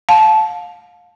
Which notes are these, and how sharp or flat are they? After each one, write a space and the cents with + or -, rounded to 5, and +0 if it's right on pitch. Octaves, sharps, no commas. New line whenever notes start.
F5 +30 A5 -20